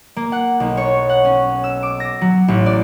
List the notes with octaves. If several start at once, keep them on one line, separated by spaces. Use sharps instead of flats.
A#3
F#5
B1
C#5
F#5
C#4
E6
D6
A#6
F#3
A1
D5